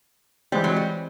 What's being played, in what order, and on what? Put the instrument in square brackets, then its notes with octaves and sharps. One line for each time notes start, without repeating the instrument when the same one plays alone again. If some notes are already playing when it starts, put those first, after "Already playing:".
[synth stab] E3 G#3 C4 [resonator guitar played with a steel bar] G3
[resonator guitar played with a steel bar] F#3
G3